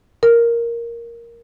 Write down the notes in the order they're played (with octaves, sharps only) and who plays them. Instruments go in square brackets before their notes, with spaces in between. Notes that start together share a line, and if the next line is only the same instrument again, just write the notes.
[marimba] A#4